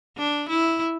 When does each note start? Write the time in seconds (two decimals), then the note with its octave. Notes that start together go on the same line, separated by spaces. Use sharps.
0.17 D4
0.49 E4